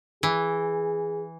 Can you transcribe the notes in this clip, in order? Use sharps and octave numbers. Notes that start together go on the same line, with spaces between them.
E3 G#4